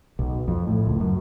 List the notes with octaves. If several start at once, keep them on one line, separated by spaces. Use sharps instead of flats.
B1
F2
A2
C#2
F#2